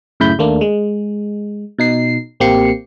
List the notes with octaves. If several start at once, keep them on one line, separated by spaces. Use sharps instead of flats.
F#2 A2 C#3 E4 B5 G6
D#2 A3 A#3 D4
G#3
B2 D#4 C7
A1 A#3 C4 G4 C7 C#7